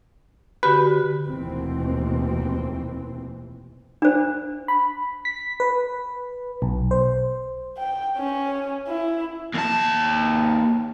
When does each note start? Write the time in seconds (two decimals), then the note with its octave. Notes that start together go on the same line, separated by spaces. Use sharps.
0.63 D3 F#4 G4 B4
1.26 F1 D#2 B2 E3 C4
4.02 D4 C5
4.68 B5
5.25 B6
5.60 B4
6.62 B1
6.91 C5
7.77 G5
8.18 C#4
8.88 E4
9.54 D#2 A5